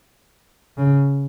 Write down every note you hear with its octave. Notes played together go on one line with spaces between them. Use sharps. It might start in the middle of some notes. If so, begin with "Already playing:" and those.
C#3